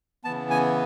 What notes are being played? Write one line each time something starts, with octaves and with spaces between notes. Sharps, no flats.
C#3 E3 B3 A5
G#5